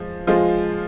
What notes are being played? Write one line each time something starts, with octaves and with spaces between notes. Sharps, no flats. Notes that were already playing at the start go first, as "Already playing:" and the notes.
Already playing: F3 G#3
F3 G#3 F4